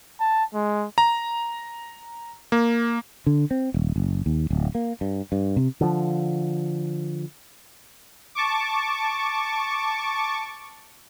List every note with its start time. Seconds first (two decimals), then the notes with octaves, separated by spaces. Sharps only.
0.20 A5
0.54 G#3
0.98 A#5
2.52 A#3
3.27 D3
3.51 C4
3.74 D#1
3.96 F#1
4.26 D#2
4.50 D1
4.75 A#3
5.01 G2
5.32 G2
5.56 C3
5.81 D3 F3
8.35 A5 C#6 D6